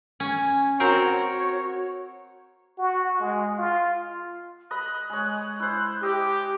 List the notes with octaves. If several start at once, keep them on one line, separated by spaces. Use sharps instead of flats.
C#4 G#5
C4 F#4 A#4 C5 C#5
F#4
G#3
F4
D#5 B5 C6 F#6
G#3 C#5
E4 C5
G4 D#5